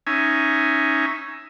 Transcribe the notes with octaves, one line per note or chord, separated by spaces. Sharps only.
C#4 D#4 E5 G#5